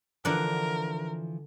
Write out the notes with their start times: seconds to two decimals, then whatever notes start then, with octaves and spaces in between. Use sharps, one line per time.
0.25 D3 E3 F3 F4 A#4 D5 F#5